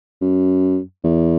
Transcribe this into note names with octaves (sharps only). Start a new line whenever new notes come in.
F#2
E2